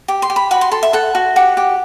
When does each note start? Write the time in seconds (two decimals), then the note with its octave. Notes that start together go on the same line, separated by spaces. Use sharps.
0.08 G4
0.22 C6
0.30 G4
0.36 B5
0.51 F#4 B5
0.61 C6
0.72 A4 C6
0.83 E5
0.93 A4 F#5
1.15 F#4
1.36 G4 F#5
1.57 G4